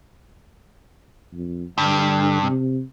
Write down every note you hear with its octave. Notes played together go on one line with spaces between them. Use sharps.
F2
G2 D3
C3